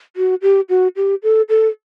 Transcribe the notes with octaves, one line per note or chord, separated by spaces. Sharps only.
F#4
G4
F#4
G4
A4
A4